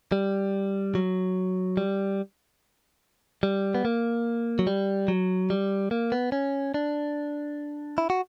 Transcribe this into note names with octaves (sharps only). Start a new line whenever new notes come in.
G3
F#3
G3
G3
B3
A#3
F#3
G3
F#3
G3
A#3
B3
C#4
D4
E4
F#4